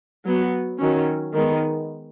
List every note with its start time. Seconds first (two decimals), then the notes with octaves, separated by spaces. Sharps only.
0.25 F#3 B3
0.79 D#3 F#3 C#4
1.34 D#3 G#3 B3